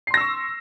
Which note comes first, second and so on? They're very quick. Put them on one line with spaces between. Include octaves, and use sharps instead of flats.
C7 C6 A#6 E6 C#6